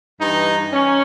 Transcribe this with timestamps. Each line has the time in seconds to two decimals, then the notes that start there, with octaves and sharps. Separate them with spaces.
0.20 G2 E3 D#4
0.74 C#4